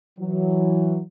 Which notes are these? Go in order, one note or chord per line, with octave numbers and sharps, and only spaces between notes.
E3 F#3